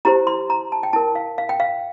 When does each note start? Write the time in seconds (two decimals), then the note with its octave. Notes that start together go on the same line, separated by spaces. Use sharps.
0.05 E4 G4 C5 A#5
0.27 C6
0.50 A#5
0.72 A5
0.83 G5
0.93 E4 A#4 A5
1.15 F5
1.38 F5
1.49 G5
1.60 F5